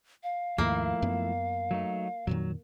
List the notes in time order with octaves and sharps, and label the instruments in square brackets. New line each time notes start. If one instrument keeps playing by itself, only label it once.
[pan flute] F5
[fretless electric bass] D#2 G#2 D#3 [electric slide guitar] F3 A3 E4 [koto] A#3
[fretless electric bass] F#2 B3
[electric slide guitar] F#3 A3 D#4
[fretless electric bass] F2 A#2 D#3 [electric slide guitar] F#3